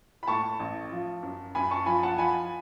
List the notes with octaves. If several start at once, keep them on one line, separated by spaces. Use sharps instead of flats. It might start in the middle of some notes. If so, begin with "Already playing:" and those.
B5
A2 A5 C#6
A1
F3
F#2
F#2 G#5 B5
A5 C#6
F3 G#5 B5
F#5 A5
F3 G#5 B5